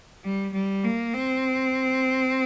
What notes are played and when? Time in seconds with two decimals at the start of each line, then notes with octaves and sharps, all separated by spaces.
0.24 G3
0.53 G3
0.84 A#3
1.14 C4